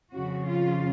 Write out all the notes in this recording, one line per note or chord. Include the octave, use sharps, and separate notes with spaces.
F2 C#3 F3 F#4
F4